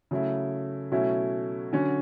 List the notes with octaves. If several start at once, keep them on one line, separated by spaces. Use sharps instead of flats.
C#3 F#3 A3 E4
B2 F#3 A3 C#4 E4
D3 F#3 C#4